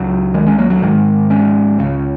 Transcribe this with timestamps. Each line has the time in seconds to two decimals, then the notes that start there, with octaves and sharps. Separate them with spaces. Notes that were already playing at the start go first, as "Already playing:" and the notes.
Already playing: C#2 C#3 F#3
0.34 D#3 G#3
0.46 G#3 C#4
0.58 F#3 A#3
0.70 F#3
0.82 G#1 G#2 D#3 G#3
1.30 G#3 C#4
1.78 C#2 C#3